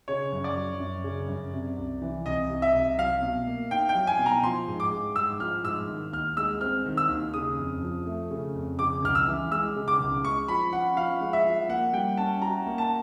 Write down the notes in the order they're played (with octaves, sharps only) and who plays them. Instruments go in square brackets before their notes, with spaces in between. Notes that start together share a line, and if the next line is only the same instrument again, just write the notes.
[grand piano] C#3 [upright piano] C#5
[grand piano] F#2
[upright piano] D5
[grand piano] F#3
F#2
C#3
F#2
C3
C2
E3
[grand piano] C2 [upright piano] D#5
[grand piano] C3
[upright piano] E5
[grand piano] C2
[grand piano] F#3 [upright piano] F5
[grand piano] B2
A#3
[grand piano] D#4 [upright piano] G5
[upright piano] G5
[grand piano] F#3
[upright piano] G#5
[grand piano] B2
[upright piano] A#5
[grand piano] F3 [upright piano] C6
[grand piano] G#2
[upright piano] D6
[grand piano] G#3
[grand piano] G#2 [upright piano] E6
[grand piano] F3 [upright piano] F6
[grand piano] G#2 [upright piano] E6
[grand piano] D#3
[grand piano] D#2 [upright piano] F6
[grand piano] G#3 [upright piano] E6
[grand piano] C4 [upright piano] F6
[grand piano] D#3
[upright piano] E6
[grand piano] D#2
[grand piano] C#3 [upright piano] D#6
[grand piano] F2
F3
A3
C#3
F2
[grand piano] C#3 [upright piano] D6
[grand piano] C#2 [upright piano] F6
[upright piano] E6
[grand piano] E3
[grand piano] G#3 [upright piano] E6
[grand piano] C#3
[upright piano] D6
[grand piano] C#2
[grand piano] G#3 [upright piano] C#6
[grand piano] F3 [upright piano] B5
[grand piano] C#4 [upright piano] F#5
[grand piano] F3 [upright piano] F5
[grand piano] G#3
[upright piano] E5
[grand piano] F3
[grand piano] A#3 [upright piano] F#5
[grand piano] G3 [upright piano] G5
[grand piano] C#4 [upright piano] A5
[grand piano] F#4 [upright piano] A#5
[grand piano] A#3
[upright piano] A5